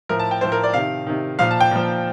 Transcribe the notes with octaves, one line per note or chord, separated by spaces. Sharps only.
A2 F3 A#4
A5
G5
A2 F3 C5
A#4
D5
C3 D#3 F5
C3 D#3
A#2 F3 F5
A5
G5
A#2 F3